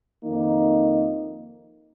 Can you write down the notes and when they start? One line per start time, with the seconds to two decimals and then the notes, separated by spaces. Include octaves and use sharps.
0.23 F2 D#3 A#3 D#4